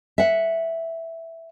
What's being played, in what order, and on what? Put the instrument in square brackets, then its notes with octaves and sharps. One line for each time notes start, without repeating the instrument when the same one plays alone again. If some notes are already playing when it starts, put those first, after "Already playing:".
[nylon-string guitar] E5 F#5